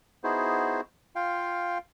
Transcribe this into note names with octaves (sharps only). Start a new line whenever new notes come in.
B3 D#4 E4 F#4 G#4 C5
F4 F5 G5